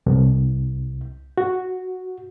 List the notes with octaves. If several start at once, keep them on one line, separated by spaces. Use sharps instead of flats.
C2
F#4